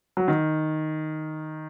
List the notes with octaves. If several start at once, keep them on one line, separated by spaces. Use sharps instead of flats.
F#3
D#3